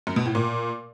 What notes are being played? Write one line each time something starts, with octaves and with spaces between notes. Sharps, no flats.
F#2
B2
A2
A#2